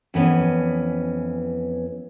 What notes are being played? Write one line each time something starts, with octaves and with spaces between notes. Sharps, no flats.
F2 E3 B3 C#4